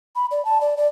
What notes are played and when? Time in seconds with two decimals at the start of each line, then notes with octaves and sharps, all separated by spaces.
0.16 B5
0.31 D5
0.45 A5
0.61 D5
0.77 D5